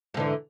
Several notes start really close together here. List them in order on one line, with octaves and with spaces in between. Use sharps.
G#2 D3 E3